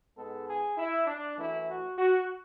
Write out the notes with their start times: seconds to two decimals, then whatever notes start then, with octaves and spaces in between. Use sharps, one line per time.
0.17 G#2 G#3 B3 A4
0.47 G#4
0.78 E4
1.07 D4
1.37 F#2 E3 A3 E4
1.68 F#4
1.98 F#4